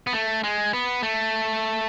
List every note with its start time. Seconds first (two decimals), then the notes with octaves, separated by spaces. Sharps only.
0.07 B3
0.13 A3
0.44 G#3
0.73 B3
1.03 A3